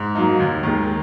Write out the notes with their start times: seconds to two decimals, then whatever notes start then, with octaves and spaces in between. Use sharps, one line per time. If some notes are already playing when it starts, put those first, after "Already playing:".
Already playing: G#2
0.15 F#3 A#3 D#4
0.40 D#2
0.63 D#3 G#3